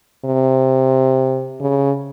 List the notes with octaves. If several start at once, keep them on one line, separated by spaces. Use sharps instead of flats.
C3
C#3